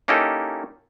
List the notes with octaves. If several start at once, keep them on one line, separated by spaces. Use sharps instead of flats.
A#3 C#4 D#4 E4 G4 A4